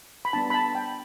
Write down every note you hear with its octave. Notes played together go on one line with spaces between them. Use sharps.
B5
G3 B3 D4 A5
B5
A5
G5